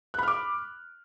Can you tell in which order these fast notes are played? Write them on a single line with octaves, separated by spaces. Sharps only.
F#6 B5 F6 D6